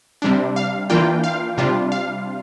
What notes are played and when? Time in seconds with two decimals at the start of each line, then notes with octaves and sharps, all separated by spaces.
0.22 C3 G3 D4
0.56 F5
0.90 E3 A#3 D4 F4 G5
1.24 F5
1.58 C3 G3 D4 F4
1.92 F5